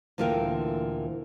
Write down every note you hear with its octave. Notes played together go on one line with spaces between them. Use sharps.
D2 A#2 E3 F4 A#4 G5